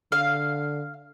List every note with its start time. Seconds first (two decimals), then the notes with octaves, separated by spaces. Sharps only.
0.12 D3 F5